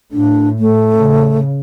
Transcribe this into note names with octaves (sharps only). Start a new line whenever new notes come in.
A2 D4
A3
C#3